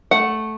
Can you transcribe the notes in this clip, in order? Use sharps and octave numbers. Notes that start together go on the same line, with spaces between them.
A3 F#5